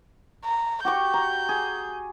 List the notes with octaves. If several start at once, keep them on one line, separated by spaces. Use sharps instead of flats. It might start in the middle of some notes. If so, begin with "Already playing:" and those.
A#5
F#4 G4 C#6 G6
A#5
G#4